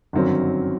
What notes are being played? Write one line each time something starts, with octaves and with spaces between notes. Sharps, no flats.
G1 F#2 D#3 F#3 C4